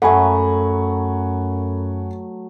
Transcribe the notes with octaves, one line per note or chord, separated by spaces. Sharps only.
F#2 F#3 A3 A4 F#5 G#5 B5